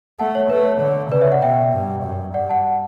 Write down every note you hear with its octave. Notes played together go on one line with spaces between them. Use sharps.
A3 F#5 A5
C#5
A3 B4
C#5
D3 C#5
C#3 B4 D5
C#5 E5
D5 F#5
B2 E5 G5
G2
F#2
G2 D5 F#5
F#5 A5